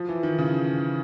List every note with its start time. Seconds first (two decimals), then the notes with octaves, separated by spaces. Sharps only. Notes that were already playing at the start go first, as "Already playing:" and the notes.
Already playing: F3
0.09 E3
0.23 D#3
0.38 C#3